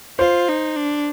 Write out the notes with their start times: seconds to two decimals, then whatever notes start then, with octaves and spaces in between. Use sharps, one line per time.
0.19 F4 C5
0.48 D#4
0.76 D4